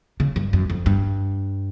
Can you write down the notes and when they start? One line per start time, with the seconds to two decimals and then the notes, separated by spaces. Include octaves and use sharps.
0.20 C#3
0.36 G2
0.53 F#2
0.70 F2
0.86 G2